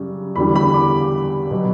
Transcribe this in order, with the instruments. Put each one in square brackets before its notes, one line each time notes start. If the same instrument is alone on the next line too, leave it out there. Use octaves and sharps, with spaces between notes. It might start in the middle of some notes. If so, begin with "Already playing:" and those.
Already playing: [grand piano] F#2 C#3 G3
E2 D3 G3 B5
B5
D6
B2 F#3